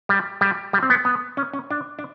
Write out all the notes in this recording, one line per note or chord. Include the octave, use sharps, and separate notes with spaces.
G3
G3
G3
C4
B3
B3
C#4
C#4
D4
D4